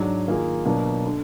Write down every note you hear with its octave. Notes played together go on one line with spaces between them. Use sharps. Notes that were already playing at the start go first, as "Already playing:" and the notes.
Already playing: G#2 F#3 D4
D#3 A#3 F4 G#4
B2 F#3 A#3 D4
D3